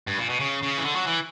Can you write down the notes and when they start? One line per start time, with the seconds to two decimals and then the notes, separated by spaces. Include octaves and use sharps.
0.07 G2
0.18 A#2
0.29 B2
0.40 C#3
0.63 C#3
0.77 E3
0.84 D3
0.95 F#3
1.07 E3